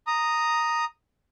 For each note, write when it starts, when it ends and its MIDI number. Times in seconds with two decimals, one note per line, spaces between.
0.07 0.85 82
0.07 0.85 87